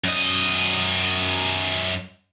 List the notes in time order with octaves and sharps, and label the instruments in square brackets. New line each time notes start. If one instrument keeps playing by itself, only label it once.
[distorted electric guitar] F#2 D#5